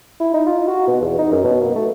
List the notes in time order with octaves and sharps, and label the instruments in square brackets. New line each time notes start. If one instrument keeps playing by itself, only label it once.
[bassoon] E4
D#4
F4
F#4
B2
E2
D#4
F#2
B2
A#3
A3